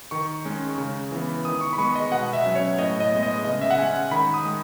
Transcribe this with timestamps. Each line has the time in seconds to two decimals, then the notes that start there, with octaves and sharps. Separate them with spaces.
0.11 D#3 C#6
0.45 G#3 C#4
0.78 C#3
1.12 E3 B3
1.45 D#3 D#6
1.61 C#6
1.73 B5
1.78 G#3 B3 C#6
1.95 D#5
2.11 B2 F#5
2.33 E5
2.45 F#3 C#4
2.55 C#5
2.79 A2 D#5
3.00 D#5
3.12 G#3 B3
3.23 D#5
3.44 C#3 D#5
3.61 E5
3.71 F#5
3.78 G#3 C#4 G#5
4.11 D#3 B5
4.34 D#6
4.45 G#3